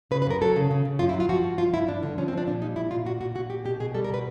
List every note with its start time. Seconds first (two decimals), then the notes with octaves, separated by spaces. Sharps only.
0.11 C#3 B4
0.22 B4
0.26 F#2 A#4
0.41 F#3 A4
0.56 C#3
0.71 C#3
0.85 C#3
0.99 F#2 F4
1.09 E4
1.14 F#3
1.20 F4
1.29 F3 F#4
1.44 G2
1.58 F3 F4
1.74 G2 E4
1.88 G2 D4
2.03 D3
2.18 F3 C#4
2.28 C4
2.33 F3 D4
2.47 A#2 D4
2.61 G3 D#4
2.76 A#2 E4
2.91 A#2 F4
3.06 A#2 F#4
3.21 A#2 F#4
3.35 A#2 F#4
3.50 A#2 G4
3.65 B2 G4
3.80 B2 G#4
3.95 G3 A4
4.04 A#4
4.10 B2 B4